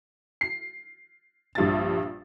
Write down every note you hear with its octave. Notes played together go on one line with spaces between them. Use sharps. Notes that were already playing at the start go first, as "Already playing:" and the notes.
C7
A#1 G2 E5 A6